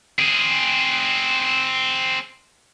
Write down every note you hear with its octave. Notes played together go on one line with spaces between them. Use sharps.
C4 G#4